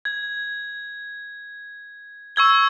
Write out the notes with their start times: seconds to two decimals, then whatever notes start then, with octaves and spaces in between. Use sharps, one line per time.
0.05 G#6
2.36 C#6 E6 G#6 G7